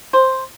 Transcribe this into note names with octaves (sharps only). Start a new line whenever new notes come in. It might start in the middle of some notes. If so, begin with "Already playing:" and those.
C5